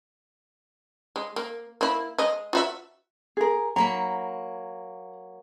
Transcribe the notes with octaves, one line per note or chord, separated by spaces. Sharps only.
G#3
A#3
A#3 E4
G#3 D#5
F4 F#4 E5
G#4 A#4
F#3 A#3 A#5 B5